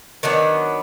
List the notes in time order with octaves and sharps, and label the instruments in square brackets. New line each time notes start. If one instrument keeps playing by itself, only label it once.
[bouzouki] D#3 F#3 B3 D4